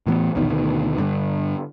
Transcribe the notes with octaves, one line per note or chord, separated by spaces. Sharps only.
A2 E3 B3
A#1 E2 B2 D#3
D2 B2 D#3
G2 D3